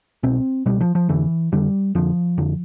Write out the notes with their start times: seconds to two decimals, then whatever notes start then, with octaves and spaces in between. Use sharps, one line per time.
0.23 C2 B2 C4
0.66 C2 B2 G3
0.80 F3
0.95 F3
1.09 F2 D3 E3
1.52 F2 D3 G3
1.95 F2 D3 F3
2.38 F2 D3